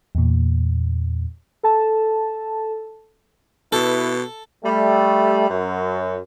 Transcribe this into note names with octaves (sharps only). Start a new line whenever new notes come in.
E2 A#2
A4 A5
B2 E4 A4 B4
G3 A3
F#2